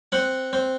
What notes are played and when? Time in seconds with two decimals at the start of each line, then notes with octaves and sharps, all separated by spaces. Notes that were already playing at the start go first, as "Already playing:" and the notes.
0.12 C4 F#5
0.53 C4